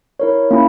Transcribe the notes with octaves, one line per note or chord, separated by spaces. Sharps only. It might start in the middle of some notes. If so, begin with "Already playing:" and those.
E4 A#4 C#5
A#3 C#4 E4